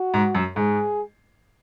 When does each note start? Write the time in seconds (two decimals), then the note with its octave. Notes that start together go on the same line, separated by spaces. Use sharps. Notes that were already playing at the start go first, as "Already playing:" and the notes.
Already playing: F#4
0.14 G#2
0.35 F#2
0.56 G#2 G#4